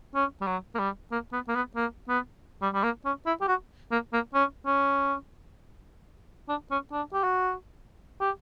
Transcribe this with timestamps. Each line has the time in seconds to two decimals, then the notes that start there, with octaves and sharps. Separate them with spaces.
0.15 C#4
0.41 G3
0.47 F#3
0.75 A#3
0.79 G3
1.12 A#3
1.32 B3
1.48 A#3
1.55 B3
1.76 A#3
2.09 B3
2.62 G3
2.74 G3
2.83 A#3
3.05 C#4
3.26 E4
3.41 G4
3.48 F#4
3.91 A#3
4.13 A#3
4.34 C#4
4.66 C#4
6.49 D4
6.71 C#4
6.92 D4
7.13 G4
7.24 F#4
8.21 G4